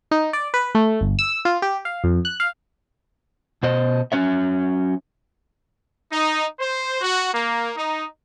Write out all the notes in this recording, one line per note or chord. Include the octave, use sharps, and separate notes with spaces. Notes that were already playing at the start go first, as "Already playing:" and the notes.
D#4
D5
B4
A3
G1
E6
F4
G4
F5
F2
F#6
F5
B2 C5 D#5
F#3 C#4 C#5 E5
D#4
C5
F#4
A#3
D#4